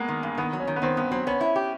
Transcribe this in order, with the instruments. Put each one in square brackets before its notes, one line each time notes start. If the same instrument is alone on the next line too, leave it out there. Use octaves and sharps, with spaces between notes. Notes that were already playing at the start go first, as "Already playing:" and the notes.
Already playing: [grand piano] G#3 A#3 B3
[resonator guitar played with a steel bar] D#3
G2
[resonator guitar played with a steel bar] D#3 [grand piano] B3
[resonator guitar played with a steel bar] F#3
[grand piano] C#4
[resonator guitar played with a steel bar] D#3
[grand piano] B3
[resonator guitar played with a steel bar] D#3 [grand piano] C4
[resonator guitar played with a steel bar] G2 [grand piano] B3
[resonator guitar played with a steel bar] F#3 [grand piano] C4
[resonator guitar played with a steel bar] B3 [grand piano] C#4
[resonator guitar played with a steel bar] E4
G4